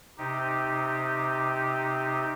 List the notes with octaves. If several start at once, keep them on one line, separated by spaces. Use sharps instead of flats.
C3 D#4 G4